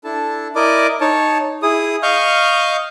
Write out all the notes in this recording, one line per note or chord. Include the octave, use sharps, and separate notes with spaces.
D4 E4 A4 A5
E4 A#4 D5 D#5 D6
D#4 C#5 A5
E4 G#4 D#6
D#5 F5 C#6 F6 G6